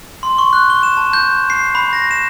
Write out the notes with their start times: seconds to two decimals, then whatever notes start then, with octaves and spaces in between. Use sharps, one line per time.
0.23 C6
0.38 C#6
0.53 F#6
0.70 G7
0.83 E7
0.97 A5
1.13 G6
1.50 C7
1.75 B5
1.93 A#6
2.11 E7